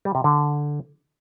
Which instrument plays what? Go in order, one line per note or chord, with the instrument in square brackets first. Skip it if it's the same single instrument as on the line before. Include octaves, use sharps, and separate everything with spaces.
[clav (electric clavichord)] G3
C3
D3